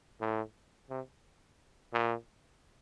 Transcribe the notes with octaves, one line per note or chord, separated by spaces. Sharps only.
A2
C3
A#2